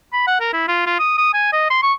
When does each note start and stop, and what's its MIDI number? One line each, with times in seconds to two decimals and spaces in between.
0.13 0.23 83
0.27 0.36 78
0.40 0.51 70
0.53 0.66 64
0.68 0.84 65
0.86 0.96 65
0.99 1.15 87
1.18 1.32 87
1.34 1.53 80
1.53 1.69 75
1.70 1.78 84
1.83 1.93 85